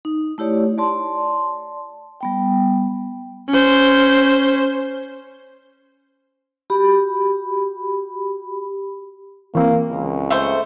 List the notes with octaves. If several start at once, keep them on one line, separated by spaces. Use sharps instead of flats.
D#4
A3 E4 G4 C#5 D5
D5 A5 C6
G3 B3 G5
C#4 C5
F#4 G4 B5
E3 A#3 C4
C#2
A3 C5